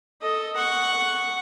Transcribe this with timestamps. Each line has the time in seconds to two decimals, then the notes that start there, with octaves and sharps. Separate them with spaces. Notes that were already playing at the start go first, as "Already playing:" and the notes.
0.21 A4 D#5
0.56 F#5 C#6